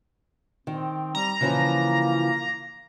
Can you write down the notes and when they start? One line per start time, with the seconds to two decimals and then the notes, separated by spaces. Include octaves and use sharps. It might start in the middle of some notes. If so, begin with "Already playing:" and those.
0.67 D#3 C4
1.15 G3 A#5
1.41 C#3 E3 F3 A#3